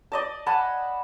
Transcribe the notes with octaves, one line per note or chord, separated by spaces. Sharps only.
D5 D#5 A5
F#5 G#5 A5 B5